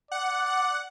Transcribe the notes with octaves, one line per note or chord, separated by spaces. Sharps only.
D5 F#5
F#5